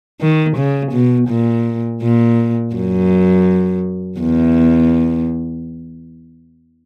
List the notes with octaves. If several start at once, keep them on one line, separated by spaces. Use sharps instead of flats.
D#3
C#3
B2
A#2
A#2
F#2
E2